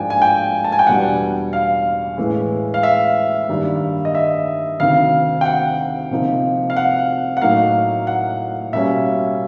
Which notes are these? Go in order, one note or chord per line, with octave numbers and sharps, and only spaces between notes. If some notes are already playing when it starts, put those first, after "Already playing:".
Already playing: G#2 F3 A#3 D4 G5 G#5
G#5
G5
A5
G#5
G5
E2 B2 G3 B3 D4 F#5
F5
A2 E3 G#3
F5
E5
G2 D#3 G3 A#3 D4
D#5
E5
D2 C3 D#3 F5
G5
F#5
C3 F3 A#3 D#4
F5
F#5
F#5
A2 F#3 A#3 D#4 F5
F#5
B2 G3 A#3 C#4 E5